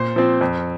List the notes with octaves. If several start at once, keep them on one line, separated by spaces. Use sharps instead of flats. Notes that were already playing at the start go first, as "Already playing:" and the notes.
Already playing: A#2 C5
F3 C4
F2